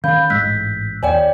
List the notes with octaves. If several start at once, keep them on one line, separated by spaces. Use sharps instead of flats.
D#3 C#4 F5 B5 G6
A1 G#2 G#3 E6 F#6 B6
D#2 C#5 D5 G5 G#5